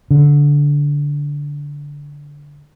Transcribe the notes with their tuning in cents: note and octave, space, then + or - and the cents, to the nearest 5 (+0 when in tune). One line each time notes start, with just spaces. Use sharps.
D3 -15